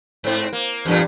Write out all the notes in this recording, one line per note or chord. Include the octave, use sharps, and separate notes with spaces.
G#2 C4
A#3
E2 G2 A#2